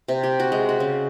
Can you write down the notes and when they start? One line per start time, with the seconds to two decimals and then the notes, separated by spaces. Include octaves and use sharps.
0.08 C3
0.23 G4
0.39 F#4
0.52 G#3
0.69 F#4
0.80 C#3